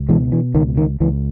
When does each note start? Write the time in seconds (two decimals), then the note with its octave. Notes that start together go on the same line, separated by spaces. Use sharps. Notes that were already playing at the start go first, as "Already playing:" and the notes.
Already playing: C#2
0.09 B2 E3 G#3
0.32 E3
0.54 C#2 D#3
0.77 D#3
1.00 C#2 E3